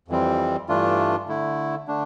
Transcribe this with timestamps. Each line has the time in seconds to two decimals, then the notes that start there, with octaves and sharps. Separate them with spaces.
0.08 F2 E3 G3 C4
0.68 G2 E3 A3 D4 F4
1.28 D3 A3 E4
1.88 D3 A3 D4